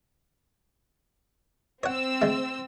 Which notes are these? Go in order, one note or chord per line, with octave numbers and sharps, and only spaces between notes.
C4 C#5 F#5 E6
D3 G#3 A3